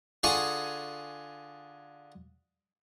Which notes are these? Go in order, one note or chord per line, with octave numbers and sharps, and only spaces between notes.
D3 F4 G#4 G#5 C#6 D#6